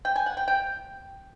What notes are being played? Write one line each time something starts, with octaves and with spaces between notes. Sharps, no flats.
G5
G#5
F#5
G5
G5